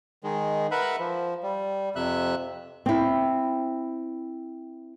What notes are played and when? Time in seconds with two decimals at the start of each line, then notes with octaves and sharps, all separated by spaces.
0.24 D#3 G#3
0.71 A#4 B4 E5 F#5 B5
1.00 F3
1.43 G3
1.96 F2 C3 E5 F#6
2.86 C4 E4